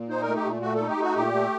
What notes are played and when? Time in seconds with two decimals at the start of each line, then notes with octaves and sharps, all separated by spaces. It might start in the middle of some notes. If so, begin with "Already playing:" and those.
Already playing: A#2
0.09 D#4 C5
0.22 A#4
0.27 A3
0.36 G4
0.45 A#2
0.62 A3 F#4
0.75 D#4 A4
0.89 G4
0.98 A3 F#4
1.16 A#2 G4
1.33 A3